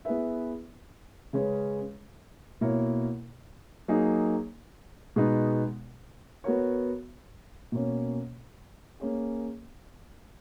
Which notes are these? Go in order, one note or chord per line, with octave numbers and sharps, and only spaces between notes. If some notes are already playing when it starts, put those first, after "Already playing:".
B3 E4 G#4 B4 E5
C#3 G#3 C#4 G#4 B4
B2 A#3 E4 A#4 C#5
F#3 A#3 D#4 G#4
B2 G#3 B3 D#4
B3 F#4 A#4 C#5
B2 A#3 C#4
A#3 C#4 G#4